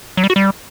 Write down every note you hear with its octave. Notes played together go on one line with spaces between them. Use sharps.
F#3
G3
F#4
G3